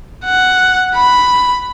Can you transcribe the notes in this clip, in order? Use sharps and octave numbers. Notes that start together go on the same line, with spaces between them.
F#5
B5